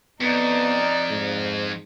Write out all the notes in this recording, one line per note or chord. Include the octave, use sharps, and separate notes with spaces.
F2 B3 D#4 D5
G#2